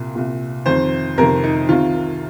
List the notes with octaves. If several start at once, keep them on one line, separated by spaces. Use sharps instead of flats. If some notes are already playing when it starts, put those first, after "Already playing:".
Already playing: C2 A#2
C2 A#2
F2 C3 D#3 C5
F2 C3 D#3 A#4
D#4
C2 C3 D#3 F4